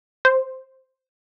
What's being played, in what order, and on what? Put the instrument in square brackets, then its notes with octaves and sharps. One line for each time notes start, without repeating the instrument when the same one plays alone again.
[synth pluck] C5